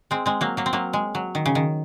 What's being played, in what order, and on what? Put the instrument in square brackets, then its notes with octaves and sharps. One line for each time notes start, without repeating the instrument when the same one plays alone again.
[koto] G#3 C4
G#3 C4
F#3 A#3
F#3 A#3
C4
F#3 A#3
G#3
F#3
D#3
C#3
D#3